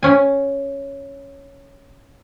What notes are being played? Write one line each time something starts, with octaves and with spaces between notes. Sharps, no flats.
C#4 G#5